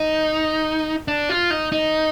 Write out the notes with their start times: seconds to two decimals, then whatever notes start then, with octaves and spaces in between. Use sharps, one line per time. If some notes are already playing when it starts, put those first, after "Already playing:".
Already playing: D#4
1.08 D4
1.29 F4
1.50 D#4
1.72 D#4